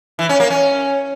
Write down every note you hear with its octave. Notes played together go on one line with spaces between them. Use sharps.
E3
C#4
A#3
C#4